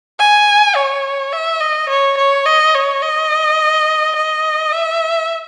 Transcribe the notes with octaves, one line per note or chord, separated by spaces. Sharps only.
G#5
C#5
E5
D#5
C#5
C#5
D#5
C#5
D#5
D#5
E5